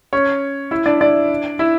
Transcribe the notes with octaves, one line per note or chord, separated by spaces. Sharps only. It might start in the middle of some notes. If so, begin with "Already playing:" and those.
C#4 C#5
E4 E5
D4 D5
D4 D5
E4 E5